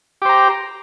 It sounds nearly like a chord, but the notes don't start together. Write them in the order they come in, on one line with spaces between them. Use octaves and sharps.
G4 C5 A#5